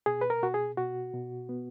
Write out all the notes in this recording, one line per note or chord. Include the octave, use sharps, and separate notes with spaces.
B2 G#4
B4
A#4
B2 F#4
G#4
B2 F#4
B2
B3